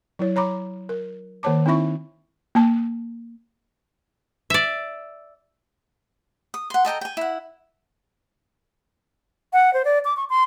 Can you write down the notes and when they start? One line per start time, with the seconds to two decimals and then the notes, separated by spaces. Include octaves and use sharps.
0.19 F#3 E4 C#5
0.36 C#5 A#5 B5 D6
0.89 A#4
1.43 D#3 A#3 C5 C#5 A5 D6
1.66 C4 D#4 E4 E5 B5 C#6
2.55 A#3 A5
4.50 D5 E5
6.54 D#6
6.70 F#5 C6
6.85 A4 D#5 G5 A#5
7.01 G5 G#5
7.17 E4 F#5
9.53 F#5
9.74 C5
9.85 D5
10.05 D6
10.17 C#6
10.30 C6